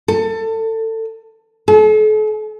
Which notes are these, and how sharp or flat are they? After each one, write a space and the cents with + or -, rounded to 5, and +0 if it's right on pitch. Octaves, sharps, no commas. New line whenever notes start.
A4 +25
A4 -40